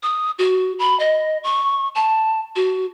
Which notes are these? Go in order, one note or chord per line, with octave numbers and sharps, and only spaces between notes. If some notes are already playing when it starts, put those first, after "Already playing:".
D#6
F#4
B5
D#5
C#6
A5
F#4